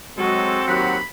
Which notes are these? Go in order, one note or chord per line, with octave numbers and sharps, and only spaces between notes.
F#3 G#3 C4 F#4 A4
D#2 F#3 F#5 B5